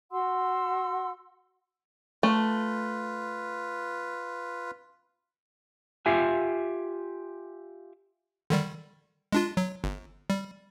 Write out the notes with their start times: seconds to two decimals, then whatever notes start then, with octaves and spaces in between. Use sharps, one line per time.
0.12 F#4 F#5 C6 E6
2.23 A3 F4 B4
6.06 F4 G4 E5 G#5
8.50 D3 D#3 G3
9.32 G#3 D4 F4
9.57 F#3
9.84 G1
10.30 G3